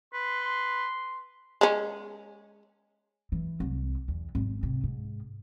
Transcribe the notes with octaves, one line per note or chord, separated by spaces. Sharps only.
B4 C6
G#3 C#4
E3
C2
E2
G#1
C3
G#2